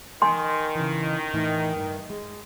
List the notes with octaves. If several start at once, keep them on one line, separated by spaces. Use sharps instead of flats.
D#3 G#5 C6
C#3 E3
A2 E3 D#4
G2
G#3